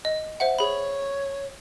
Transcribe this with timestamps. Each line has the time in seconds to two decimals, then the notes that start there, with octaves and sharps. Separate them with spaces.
0.05 D#5
0.40 C5 E5 F#5
0.59 G#4 C#5 B5